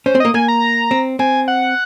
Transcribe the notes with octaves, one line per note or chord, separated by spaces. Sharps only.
C#4 C5
C4
A#3 D#5
A#3 G#5
A#5
C4
C4 G#5
F#5